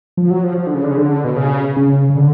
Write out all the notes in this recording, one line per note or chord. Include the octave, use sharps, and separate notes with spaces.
F3
F#3
F3
F3
D3
C#3
D3
C#3
D3
B2
C#3
C#3
C#3
D3